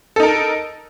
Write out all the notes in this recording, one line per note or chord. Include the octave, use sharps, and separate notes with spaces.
D#4 A4 A#4